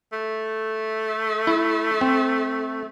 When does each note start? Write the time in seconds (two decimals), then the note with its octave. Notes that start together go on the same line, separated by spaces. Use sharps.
0.13 A3
1.47 E4
2.01 C4